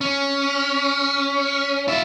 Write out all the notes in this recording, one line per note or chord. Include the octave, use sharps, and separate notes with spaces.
C#4
F4 E5